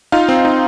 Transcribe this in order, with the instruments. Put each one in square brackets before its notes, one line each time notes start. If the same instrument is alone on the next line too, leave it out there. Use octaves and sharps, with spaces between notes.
[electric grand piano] D#4 F4 F5
C4
D#4